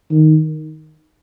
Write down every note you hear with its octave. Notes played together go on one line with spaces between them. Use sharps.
D#3